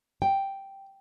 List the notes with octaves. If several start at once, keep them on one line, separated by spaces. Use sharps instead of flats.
G5